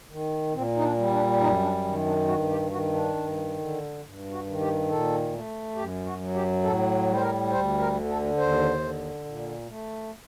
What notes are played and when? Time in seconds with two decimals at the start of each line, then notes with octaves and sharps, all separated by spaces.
0.10 D#3
0.54 A#2 C4
0.77 D#4
0.83 D4
0.98 G3
1.11 D4
1.41 F#2 D#4
1.62 D4
1.85 D#3
2.06 D4
2.28 G2 F#4
2.50 G4
2.71 D#3 F#4
2.93 D4
3.15 G2
3.59 D3
4.03 G2
4.31 F#4
4.46 D#3
4.60 G4
4.89 A#2 A4
5.33 A3
5.76 F#2 G4
6.06 F#4
6.20 F#3
6.34 G4
6.63 A2 A4
7.07 G3
7.14 C5
7.21 A#4
7.51 D2 C5
7.79 A#4
7.94 D3
8.09 A4
8.37 D#2 C5
8.81 D3
9.25 A#2
9.69 A3